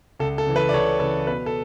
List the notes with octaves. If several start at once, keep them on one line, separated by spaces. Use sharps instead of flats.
C#2 A4
A4
C#3 E3
B4
D5
C#2 A4 C#5
C#3 E3 A4
B2 B4
A4